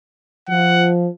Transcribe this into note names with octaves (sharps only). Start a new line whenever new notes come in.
F3 F#5